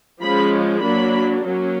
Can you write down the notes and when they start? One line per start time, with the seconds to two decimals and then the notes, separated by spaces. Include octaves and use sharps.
0.21 F3 G#3 C#4 B5
0.82 F#3 A#3 D4 B5
1.43 F#3 A#3 C#4